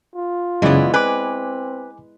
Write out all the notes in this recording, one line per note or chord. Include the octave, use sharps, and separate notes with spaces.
F4
F#2 C#3 E3 G#3 B3 E4 D5
C4 B4 G#5 D6